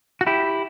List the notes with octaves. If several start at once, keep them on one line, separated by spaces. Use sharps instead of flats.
F#4
E4 G4